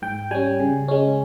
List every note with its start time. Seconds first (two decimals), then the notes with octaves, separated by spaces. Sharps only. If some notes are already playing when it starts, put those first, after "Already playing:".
0.02 G#2 G5
0.31 G3 C#4 G#5
0.60 C#3
0.88 G#3 C#4